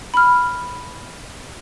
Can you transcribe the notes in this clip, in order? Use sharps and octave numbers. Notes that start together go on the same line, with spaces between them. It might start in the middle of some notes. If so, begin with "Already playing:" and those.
B5 F6